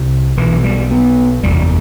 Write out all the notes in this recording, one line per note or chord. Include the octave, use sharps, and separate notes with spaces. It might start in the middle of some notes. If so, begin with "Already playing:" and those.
Already playing: C2 C3
B1 B2 E3
G3
B3
F#1 E2 C3 G3